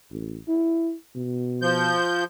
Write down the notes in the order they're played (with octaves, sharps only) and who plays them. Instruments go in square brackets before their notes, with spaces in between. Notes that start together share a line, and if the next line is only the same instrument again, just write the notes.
[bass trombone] A1
E4
B2
[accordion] F3 G6